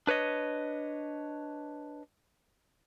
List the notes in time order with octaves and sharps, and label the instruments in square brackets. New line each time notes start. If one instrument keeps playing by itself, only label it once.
[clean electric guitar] D4 B4 C#5 D#5